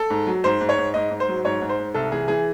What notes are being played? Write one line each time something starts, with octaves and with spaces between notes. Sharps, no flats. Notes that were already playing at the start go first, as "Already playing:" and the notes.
Already playing: A4
G#2
F#3
G#2 C5
G#2
C#5
G#2
G#2 D#5
G#2
C5
F#3
G#2 C#5
G#2
C5
G#2
C2 A4
E3 G#4
E3 G#4